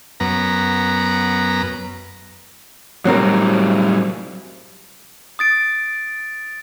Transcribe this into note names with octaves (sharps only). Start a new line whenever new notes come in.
F#2 B3 A#5
A2 F#3 G3 C4 A#4
D#6 A6 D7